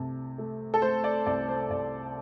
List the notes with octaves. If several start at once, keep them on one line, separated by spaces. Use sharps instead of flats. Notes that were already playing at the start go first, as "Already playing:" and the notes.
Already playing: C2 C3 A3 A5
A3
A4
A3 C5
D5
C2 D5
C5
C2 D5